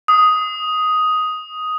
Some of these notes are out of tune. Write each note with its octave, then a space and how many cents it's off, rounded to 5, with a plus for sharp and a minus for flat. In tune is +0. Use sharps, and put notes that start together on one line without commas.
D#6 +5